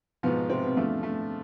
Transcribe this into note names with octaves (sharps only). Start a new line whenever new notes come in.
G#2 B2 F3 B3
C3 C4
B2 B3
E2 D3 F3 A3
A3